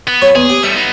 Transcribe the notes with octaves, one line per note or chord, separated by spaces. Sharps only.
B3
F#3 C#5
E2 G#4
G4
G3 A3 E5
B3 D#4